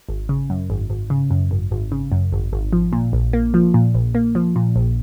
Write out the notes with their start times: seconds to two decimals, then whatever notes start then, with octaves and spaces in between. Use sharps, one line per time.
0.09 G#1
0.29 C#3
0.50 F#2
0.70 G#1
0.90 G#1
1.10 C#3
1.31 F#2
1.51 G#1
1.71 G#1
1.92 C#3
2.12 F#2
2.33 G#1
2.53 G#1
2.73 F3
2.93 A#2
3.13 A#1
3.33 A#3
3.54 F3
3.74 A#2
3.95 A#1
4.15 A#3
4.35 F3
4.56 A#2
4.76 A#1